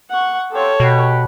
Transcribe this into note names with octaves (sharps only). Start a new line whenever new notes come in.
F#5 C#6
C4 F4 G4 A4 C#5
B2 G4 B4 F#5